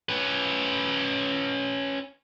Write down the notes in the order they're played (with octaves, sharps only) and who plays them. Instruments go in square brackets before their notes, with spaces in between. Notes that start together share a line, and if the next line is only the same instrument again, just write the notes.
[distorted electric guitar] C#4 B4